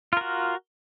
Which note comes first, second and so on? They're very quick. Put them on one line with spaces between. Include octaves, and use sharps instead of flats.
F4 A#4 F#4